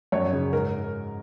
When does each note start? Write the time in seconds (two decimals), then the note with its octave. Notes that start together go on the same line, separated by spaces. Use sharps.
0.12 F#2 C#5
0.33 C#3
0.53 G#2 A#4